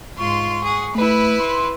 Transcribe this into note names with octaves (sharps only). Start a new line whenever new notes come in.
G#2 F4 C6 C#6
G#4 F#5
A3 E4 B4
C6